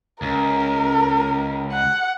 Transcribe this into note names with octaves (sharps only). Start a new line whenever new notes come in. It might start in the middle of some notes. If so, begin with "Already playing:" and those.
C#2 A#4
F#5